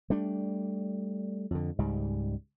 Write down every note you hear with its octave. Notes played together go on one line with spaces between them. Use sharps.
G3 A3 D4
F2 D3
C#2 G#2 G3